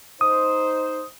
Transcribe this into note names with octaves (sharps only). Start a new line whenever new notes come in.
D#4 C5 D#6